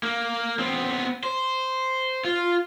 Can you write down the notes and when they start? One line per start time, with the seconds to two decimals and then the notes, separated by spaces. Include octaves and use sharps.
0.03 A#3
0.59 B3 C4
1.23 C5
2.24 F4